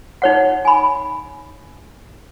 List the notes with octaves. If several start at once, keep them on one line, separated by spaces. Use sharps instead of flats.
D#4 C#5 F#5
G#5 B5